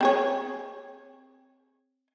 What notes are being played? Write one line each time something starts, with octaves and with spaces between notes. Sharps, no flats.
C4 G#4 C#5